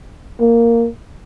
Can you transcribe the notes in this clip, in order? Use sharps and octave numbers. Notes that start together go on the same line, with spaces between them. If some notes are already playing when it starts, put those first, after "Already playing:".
A#3